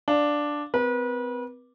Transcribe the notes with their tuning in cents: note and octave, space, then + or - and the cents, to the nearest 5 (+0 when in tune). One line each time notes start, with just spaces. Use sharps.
D4 +0 F5 +0
C4 -40 B4 -35